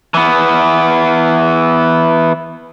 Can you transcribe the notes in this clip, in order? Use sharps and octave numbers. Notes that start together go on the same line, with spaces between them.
E3 B3